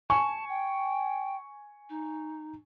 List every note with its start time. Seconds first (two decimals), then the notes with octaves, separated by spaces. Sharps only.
0.10 G#5 A5 C#6
0.49 G5
1.90 D#4